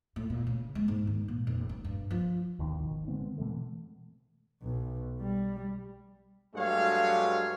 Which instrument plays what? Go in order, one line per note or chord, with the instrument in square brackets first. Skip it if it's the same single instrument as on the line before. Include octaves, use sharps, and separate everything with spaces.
[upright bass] A2
A#2
C#3
G#3
G#2
D#3
A#2
F1
G2
G2
F3
[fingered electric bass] G#1 D#2 B2 D#3
G#1 D#3
D3 G#3 B3 C4
B2 E3 G#3 A3
[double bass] B1
G3
[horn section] G2 F#3 G#3 A3 C#5 F5